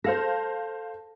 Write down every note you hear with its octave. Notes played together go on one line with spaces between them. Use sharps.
A4 C5 F5 A#6